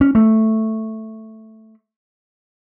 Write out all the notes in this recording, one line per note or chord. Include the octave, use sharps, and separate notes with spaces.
C#4
A3